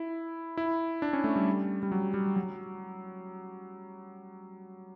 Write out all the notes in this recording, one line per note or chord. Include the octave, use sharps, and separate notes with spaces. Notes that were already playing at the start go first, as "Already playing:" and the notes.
Already playing: E4
E4
D4
C#4
A3
G3
G3
F#3
G3
F#3